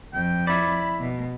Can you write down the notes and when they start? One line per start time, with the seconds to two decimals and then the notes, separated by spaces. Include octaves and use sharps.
0.14 F2 G5
0.47 E4 D5 B5
1.01 B2